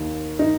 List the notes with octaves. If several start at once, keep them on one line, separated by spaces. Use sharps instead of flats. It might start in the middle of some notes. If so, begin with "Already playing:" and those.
Already playing: D#2 D#3
D#4